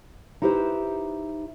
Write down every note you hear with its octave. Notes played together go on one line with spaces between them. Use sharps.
D#4 E4 G4 B4 C5